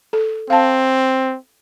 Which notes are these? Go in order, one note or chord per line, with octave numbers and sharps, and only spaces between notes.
A4
C4 F5 A5